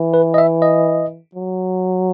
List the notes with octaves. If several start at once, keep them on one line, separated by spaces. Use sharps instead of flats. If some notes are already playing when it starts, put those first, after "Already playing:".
Already playing: E3
B4
D#5
E5
D#5
F#3